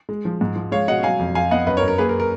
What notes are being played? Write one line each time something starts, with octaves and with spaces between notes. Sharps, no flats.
G#3
F3
G#2
F3
G#3 C#5 F5
B2 D#5 F#5
F#3 F5 G#5
F2
F2 F5 G#5
B3 D#5 F#5
F#2 B4 D#5
A#4 C#5
F#2
A#4
A#3 G#4 B4
A#4
A#4